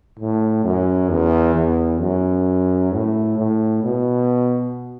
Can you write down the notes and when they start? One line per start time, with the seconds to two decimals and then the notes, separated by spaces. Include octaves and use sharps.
0.19 A2
0.64 F#2
1.10 E2
1.56 E2
2.01 F#2
2.92 A2
3.38 A2
3.84 B2